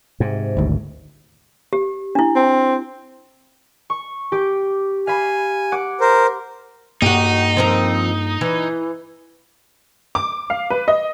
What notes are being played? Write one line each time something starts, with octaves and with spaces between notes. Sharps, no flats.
G#2 C3
G#1 D2
G4
D4 E4
C4
C#6
G4 D6
F5 G#5 B5
F#5 D6
A#4 C5
G2 A#3 D#4 F#4 G4
F3 C4 A#4
E3
D6
F5
B4
D#5